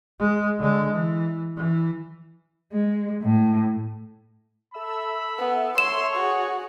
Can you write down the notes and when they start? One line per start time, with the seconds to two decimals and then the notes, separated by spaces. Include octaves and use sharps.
0.20 G#3
0.59 D3 G#3
0.91 E3
1.57 E3
2.73 G#3
3.22 A2
4.74 A4 E5 B5 E6
5.38 B3
5.78 C#5 C6 E7
6.16 F#4 G#4